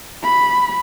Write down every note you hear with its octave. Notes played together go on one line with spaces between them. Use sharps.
B5